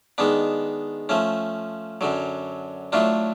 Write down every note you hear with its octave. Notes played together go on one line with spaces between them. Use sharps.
D#3 G#3 B3 D4
F3 A3 C#4
F#2 D3 F#3
A2 F#3 A3 D4 F4